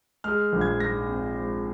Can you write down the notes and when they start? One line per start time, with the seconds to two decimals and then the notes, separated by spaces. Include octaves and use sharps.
0.24 G#3 F6
0.53 A#1
0.61 G#6
0.80 G#2 A#6
1.09 C4
1.37 G#3